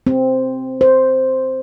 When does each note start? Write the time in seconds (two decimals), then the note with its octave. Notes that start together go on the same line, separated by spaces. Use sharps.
0.07 C4
0.81 C5